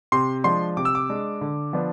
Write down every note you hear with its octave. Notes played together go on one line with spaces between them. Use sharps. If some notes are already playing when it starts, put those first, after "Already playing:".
C3 C6
F3 G#3 D4 C6
C3 D6
E6
D6
G#3 D4
D3
F3 B3 D4